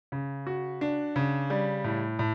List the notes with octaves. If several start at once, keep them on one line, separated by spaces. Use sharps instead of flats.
C#3
F#4
D4
C#3
G3
A2
A2